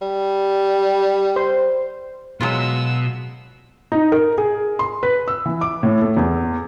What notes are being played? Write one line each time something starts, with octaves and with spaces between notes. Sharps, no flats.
G3
C5
B2 F#3 G#3 B3 F4 F#5 E6
D#4
A#4
G#4
C6
B4
E6
E3
D6
A2
A3
E2